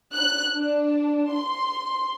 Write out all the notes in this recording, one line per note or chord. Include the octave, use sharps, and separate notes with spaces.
F#6
D4
C6